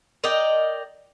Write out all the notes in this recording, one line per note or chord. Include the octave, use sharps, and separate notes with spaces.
A#4 D5 D#5 G5